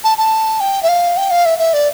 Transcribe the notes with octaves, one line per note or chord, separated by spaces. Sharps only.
A5
A5
G5
E5
F5
G5
F5
E5
E5
D5